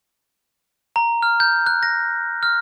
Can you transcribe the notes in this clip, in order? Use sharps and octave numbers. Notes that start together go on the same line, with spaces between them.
A#5
F6
G6
F#6
A#6
F6